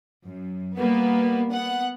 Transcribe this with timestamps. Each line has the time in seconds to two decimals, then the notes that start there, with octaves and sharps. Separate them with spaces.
0.24 F#2
0.77 G3 A#3 B3
1.51 B3 F#5